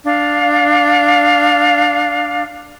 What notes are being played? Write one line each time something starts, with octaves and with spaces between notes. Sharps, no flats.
D4 F5